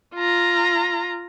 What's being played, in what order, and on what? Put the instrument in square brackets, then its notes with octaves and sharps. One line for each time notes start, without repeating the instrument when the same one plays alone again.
[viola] F4 A#5